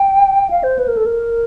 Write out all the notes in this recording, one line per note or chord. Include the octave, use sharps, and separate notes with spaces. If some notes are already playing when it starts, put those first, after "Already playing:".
Already playing: G5
F5
C5
B4
A#4
A4
A#4